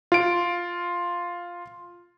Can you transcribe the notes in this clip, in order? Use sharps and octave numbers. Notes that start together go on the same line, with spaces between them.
F4 D7